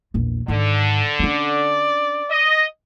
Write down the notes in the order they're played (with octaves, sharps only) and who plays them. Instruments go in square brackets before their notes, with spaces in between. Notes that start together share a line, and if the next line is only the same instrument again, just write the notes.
[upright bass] A#1 E2
[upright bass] G#2 D#3 [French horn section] D3
[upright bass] C#4 D4 [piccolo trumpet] D5
[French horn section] D#5